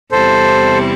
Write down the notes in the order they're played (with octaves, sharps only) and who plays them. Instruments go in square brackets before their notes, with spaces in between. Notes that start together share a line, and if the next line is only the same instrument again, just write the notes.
[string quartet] E2 C3 G3 C4 E4 [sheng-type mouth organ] A4 C5